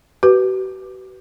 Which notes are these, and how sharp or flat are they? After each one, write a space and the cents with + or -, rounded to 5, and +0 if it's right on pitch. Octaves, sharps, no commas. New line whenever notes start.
F#4 +45 B4 +0